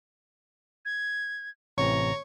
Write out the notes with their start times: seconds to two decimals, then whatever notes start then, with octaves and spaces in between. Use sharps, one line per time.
0.85 G#6
1.78 A1 C3 E3 C#5 A#5